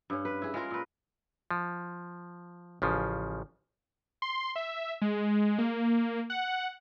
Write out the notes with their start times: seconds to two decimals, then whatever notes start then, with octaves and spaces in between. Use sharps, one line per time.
0.10 G2 C#4
0.25 B4
0.42 E4 G#4
0.54 G#3 F4 A#4
0.71 A#2 B4
1.51 F3
2.82 A1 C#3 F3
4.22 C6
4.56 E5
5.02 G#3
5.59 A#3
6.30 F#5